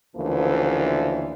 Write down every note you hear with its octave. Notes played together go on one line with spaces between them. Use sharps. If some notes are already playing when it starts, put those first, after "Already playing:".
D2 C#3 E3 F3 A#3